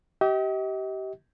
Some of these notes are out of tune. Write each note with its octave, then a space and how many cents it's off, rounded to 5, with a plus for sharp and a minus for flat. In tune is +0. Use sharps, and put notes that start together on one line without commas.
G4 -25 D#5 +40